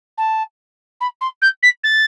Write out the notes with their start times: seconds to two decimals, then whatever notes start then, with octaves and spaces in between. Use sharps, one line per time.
0.17 A5
1.00 B5
1.21 C6
1.42 G6
1.63 B6
1.83 A6